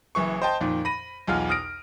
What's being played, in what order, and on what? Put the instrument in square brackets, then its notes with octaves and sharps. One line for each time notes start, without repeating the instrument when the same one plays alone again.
[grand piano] F#1 F#2 E3 C#6
C5 D#5 G5 A5 C6
F2 A#2 D#3
B5 A#6 D#7
B1 E2 F4 F6
D#6 F6 A#6 D7